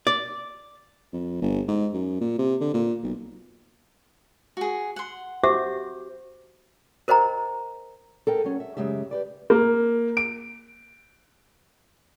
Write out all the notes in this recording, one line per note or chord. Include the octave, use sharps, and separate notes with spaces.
D5
F2
G1
G#2
F#2
A#2
C3
D3
A#2
B1
F#4 G#4
F#5 C6
F#4 G4 C5 E5 D6
A#4 C5 D#5 G5 A#5
A4 A#4 G5
F#3 C#4
E5
F#2 C#3 G#3 G4 E5
G4 B4 D5
A#3
D7